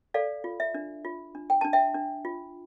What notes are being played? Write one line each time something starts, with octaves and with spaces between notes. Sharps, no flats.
A4 D5 F5
F4
E5
D4
F4
D4
G5
D4 A5
E5 G5
D4
F4